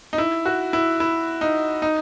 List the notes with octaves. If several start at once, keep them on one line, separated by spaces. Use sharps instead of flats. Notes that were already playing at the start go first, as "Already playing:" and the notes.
D#4
E4
F#4
E4
E4
D#4
D#4